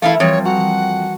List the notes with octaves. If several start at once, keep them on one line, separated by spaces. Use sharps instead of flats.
E3 A3 D4 E4 A#4 F5
F2 E3 G3 C4 C#5
F#4 F#5 A#5